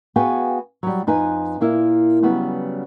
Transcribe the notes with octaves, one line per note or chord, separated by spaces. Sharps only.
B3 F#4 G#4 F5 G5 G#5
F#3 G3
F2 D#4 B4 G#5
A#2 A#3 E4
C#3 F#3 G3 B3